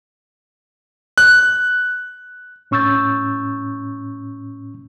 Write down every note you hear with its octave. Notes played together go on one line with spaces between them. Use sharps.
F#6
A2 C#4 C#6 E6 G6 A6